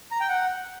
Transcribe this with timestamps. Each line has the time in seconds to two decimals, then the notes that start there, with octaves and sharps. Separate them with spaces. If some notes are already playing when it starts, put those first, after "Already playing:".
0.11 A#5
0.20 G5
0.29 F#5